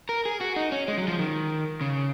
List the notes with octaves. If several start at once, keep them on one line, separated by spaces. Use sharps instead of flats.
A#4
G#4
F#4
D#4
C#4
G#3
F#3
F3
D#3
C#3